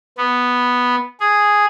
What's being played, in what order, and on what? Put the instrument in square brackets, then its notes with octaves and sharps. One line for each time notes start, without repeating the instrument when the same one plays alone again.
[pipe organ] B3
G#4